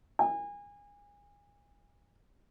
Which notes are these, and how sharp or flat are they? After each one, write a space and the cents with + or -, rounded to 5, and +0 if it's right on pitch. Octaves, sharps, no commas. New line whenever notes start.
G#5 -30